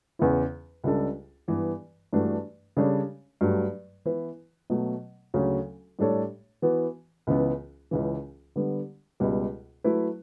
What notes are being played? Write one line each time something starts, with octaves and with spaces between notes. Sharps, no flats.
E2 C#3 E3 B3 E4
C#2 C#3 G3 D4 A4
G2 E3 B3
G2 E3 A3 D4 F#4
C#3 G3 D4 A4 C#5
G2 F#3 A3
E3 B3 E4 B4
B2 F#3 A3
D2 C#3 F#3 C#4
A2 G3 D4 A4 C#5
E3 B3 F#4
C#2 C#3 E3 B3
C#2 C#3 E3
D3 G3 B3
C#2 B2 G3
F#3 A3 E4 B4